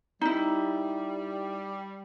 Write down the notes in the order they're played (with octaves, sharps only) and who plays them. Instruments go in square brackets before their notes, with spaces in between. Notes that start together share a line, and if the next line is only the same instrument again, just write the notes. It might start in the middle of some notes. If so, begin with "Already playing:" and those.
[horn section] G3 [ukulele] D#4 E4